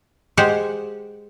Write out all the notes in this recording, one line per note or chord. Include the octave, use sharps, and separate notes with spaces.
G#3 G4 C5 F#5